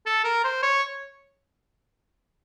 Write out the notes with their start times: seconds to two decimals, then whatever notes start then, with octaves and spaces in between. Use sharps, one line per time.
0.06 A4
0.24 A#4
0.44 C5
0.63 C#5